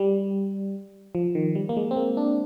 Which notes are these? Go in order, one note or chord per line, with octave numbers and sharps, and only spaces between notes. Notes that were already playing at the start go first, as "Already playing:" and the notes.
Already playing: G3
F3
D#3
G3
A#3
G#3
C4
A#3
D4